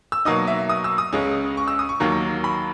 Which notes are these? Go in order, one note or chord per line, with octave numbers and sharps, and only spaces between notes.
E6
B2 F#3 A#3 D#4 D#6
E5
D#6
E6
D#6
C#2 C#3 G#3 C#4
C#6
E6
D#6
C#6
D#2 D#3 F#3 A#3
B5